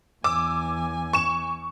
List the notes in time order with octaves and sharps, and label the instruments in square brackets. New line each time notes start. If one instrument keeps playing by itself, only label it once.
[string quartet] E2 G#5 [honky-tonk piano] D6 E6
[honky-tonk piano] C#6 E7